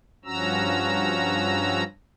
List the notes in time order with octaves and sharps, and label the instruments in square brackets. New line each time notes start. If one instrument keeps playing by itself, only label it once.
[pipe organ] G2 F3 C#4 F#4 A#5 E6